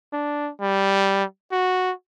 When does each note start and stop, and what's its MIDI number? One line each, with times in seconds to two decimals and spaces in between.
0.13 0.51 62
0.61 1.25 55
1.52 1.92 66